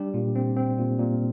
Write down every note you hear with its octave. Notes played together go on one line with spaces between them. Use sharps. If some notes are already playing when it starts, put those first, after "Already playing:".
Already playing: G3 D4 G4
A#2
C4
C4
A#2
A#2